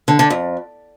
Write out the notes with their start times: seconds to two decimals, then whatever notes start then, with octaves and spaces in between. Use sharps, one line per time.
0.08 D3
0.19 D3
0.30 F2